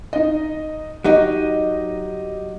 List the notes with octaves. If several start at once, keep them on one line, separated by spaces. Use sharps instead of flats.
D#4 D#5
F#3 D#4 G4 D#5